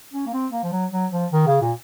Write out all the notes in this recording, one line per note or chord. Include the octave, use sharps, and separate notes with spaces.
C#4
A#3
C4
A#3
F3
F#3
F#3
F3
D#3
C#3
A#2